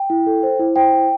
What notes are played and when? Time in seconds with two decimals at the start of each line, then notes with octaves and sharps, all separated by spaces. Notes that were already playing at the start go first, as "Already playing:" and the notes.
Already playing: G5
0.10 E4
0.27 A4
0.43 C5
0.59 E4
0.76 C5 G5
0.93 E4